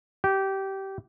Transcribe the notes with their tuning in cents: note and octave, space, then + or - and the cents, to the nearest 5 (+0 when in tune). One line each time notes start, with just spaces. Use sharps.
G4 -20